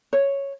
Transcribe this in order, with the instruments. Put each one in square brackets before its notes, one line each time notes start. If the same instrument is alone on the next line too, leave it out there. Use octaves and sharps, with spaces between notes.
[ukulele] C#5